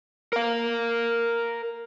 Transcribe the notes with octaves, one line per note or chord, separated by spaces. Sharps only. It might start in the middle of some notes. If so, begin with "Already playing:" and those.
A#4 F5